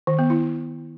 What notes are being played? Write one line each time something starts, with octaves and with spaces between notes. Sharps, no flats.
D#3
B3
E4